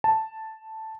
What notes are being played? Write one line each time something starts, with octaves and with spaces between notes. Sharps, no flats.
A5